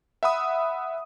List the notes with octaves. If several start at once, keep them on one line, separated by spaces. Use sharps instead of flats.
E5 F#5 B5 D#6